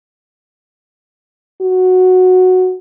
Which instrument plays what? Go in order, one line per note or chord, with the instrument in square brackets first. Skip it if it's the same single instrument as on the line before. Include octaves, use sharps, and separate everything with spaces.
[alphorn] F#4